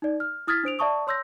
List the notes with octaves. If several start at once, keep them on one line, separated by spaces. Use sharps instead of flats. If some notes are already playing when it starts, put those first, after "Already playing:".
D#4 D5
F6
E4 D#6 F6 G#6 A6 B6
D4 C5 D7 F7
D5 E5 A5 C#6 D#6
C#5 C6 E6 G6 A#6